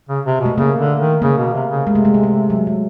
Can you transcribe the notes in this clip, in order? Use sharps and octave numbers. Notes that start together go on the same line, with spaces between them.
C#3
C3
B2
A3
C#3 A#3
D3
D#3
C#3 A#3
B2
C3
C#3
C3 G#3
A3
G#3
A3
G#3
F#3
G#3